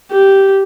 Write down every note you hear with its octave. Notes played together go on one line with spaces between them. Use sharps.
G4